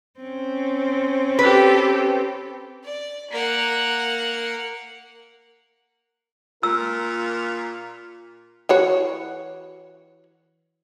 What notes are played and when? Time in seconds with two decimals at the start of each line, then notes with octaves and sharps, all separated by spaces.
0.20 C4 C#4
1.39 G4 A4 B4
2.84 D5
3.31 A#3 F#5
6.63 A#2 F4 A#4 E6
8.69 E3 F#4 C#5